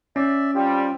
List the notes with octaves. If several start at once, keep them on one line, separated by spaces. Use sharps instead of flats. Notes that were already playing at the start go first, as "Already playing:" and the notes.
C#4 D5 E5
G3 C4 F4 G4